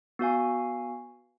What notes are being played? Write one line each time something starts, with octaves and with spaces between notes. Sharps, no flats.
B3 F#4 F5 G#5